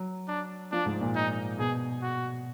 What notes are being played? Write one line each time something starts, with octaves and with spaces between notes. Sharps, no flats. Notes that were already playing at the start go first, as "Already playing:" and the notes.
Already playing: F#3
D4
F3 D4
G#2
A#2
D#4
B2 G#4
F#4